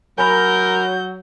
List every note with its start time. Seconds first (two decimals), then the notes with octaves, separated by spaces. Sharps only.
0.18 F#3 A#4 G#5 B5 G6